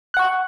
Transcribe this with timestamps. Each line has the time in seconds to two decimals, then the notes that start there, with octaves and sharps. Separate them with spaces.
0.14 F#6
0.17 F#5
0.19 C#6